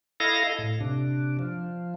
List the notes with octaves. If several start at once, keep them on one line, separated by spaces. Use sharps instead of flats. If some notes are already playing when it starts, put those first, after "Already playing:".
E4 A4 D#5 F5 A#6
A2
C3 D4
F3